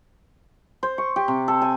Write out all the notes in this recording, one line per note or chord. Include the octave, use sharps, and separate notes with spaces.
C5
C#6
G4
C3
A4
G#5